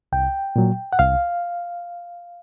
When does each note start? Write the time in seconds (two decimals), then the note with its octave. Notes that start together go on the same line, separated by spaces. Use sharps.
0.12 C2 G5
0.56 A#2 F#3
0.93 F#5
0.99 C2 F5